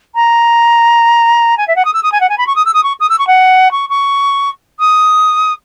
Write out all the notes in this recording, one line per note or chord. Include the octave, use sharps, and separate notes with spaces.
A#5
G#5
E5
F#5
D#6
E6
D#6
G#5
F#5
G#5
B5
C#6
D#6
E6
D#6
C#6
D#6
E6
C#6
F#5
C#6
C#6
D#6